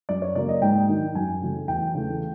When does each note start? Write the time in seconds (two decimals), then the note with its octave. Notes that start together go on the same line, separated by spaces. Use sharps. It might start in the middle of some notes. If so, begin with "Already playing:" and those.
0.09 F#2 D5
0.22 C#5
0.35 C#3 F#3 A#3 D5
0.49 D#5
0.62 G#2 G5
0.89 D#3 F#3
1.15 F#2 G#5
1.42 C#3 F#3 A3
1.68 E2 G5
1.95 C#3 E3 A3